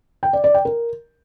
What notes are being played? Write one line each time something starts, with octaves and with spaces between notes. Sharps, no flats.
G5
D5
D5
G5
A#4